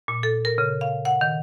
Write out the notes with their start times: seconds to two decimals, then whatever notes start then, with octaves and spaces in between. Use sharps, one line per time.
0.08 A#2
0.23 A4
0.45 A#4
0.58 C#3
0.81 F5
1.05 F#5
1.21 D#3